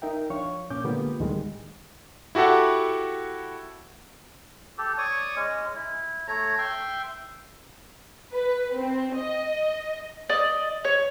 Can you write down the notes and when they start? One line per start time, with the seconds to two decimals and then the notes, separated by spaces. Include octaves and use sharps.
0.02 D#4 A#4 E5 G5
0.30 F3 D4 C#5 F5 C#6
0.70 A#2 C#4 D6 G6
0.84 D3 G#3 A#3 B3 F4 G4
1.20 D2 A2 D3 D#3 G3 G#3
2.35 E4 F#4 G4 A4 F#5
4.78 G4 A4
4.98 C#5 D5 C#6 D#6
5.36 G#3 C#4
5.76 E4
6.28 A3 C#5 A#5
6.58 E5 G5 C6
8.32 B4
8.76 C4
9.15 D#5
10.29 D5 D#5
10.85 C#5